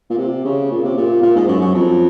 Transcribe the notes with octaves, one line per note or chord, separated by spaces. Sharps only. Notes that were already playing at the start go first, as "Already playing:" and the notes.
A#2
C3
C#3
A#2
C3
A#2
A#2
G#2
F#2
F#2
F2